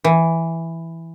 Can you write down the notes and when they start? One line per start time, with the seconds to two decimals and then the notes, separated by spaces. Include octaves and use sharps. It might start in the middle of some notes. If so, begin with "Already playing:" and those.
0.04 E3